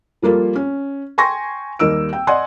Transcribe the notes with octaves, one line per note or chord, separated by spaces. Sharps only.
F3 G3 A#3 F4 A4
C#4
G5 G#5 C6 C#6 A#6
D#2 G3 A#3 D#4 E6 D7
G5
D5 D#5 F#5 G#5 C6